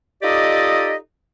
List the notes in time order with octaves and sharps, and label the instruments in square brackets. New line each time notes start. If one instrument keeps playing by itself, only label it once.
[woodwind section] D#4 F4 G4 A4 D5 D#5